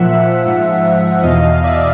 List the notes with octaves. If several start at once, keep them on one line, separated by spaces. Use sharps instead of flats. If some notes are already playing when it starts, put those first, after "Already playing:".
Already playing: A#2 F3 E5 F#5
G#2 F3
E2 B2 D#5 F5
D5 E5